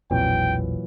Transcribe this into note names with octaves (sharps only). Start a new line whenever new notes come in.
E1 A#1 A#2 E3 F#3 C4 G5